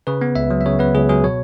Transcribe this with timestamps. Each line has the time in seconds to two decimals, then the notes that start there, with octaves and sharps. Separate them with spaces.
0.07 C#3 B4
0.21 B3
0.36 C#2 E5
0.50 F#3
0.61 E5
0.66 C#3 C#5
0.79 B3 B4
0.94 C#2 G#4
1.09 F#3 G#4
1.24 B2 C#5